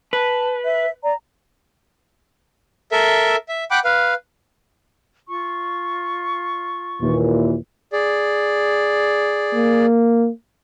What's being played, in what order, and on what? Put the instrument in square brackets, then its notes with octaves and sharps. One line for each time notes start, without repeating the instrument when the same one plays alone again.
[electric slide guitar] B4 [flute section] A5
[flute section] E5
D5 A#5
[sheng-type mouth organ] A4 A#4 E5
E5
F#5 G5 B5 D6 F#6
B4 F5
[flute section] F4 C#6
[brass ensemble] D#2 A#2 E3
[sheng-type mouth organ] G#4 D5
[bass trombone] A#3